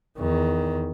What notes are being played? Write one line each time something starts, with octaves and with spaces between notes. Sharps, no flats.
E2 D#3